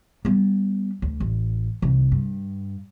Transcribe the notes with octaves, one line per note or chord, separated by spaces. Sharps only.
G3 B3
D2
A1
C2 D#3
G2